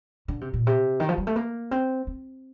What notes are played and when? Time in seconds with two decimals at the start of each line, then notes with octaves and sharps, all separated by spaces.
0.28 D3
0.41 C3
0.53 A#2
0.67 C3
1.00 D#3
1.09 F3
1.18 G3
1.27 A3
1.36 A#3
1.71 C4
2.07 C4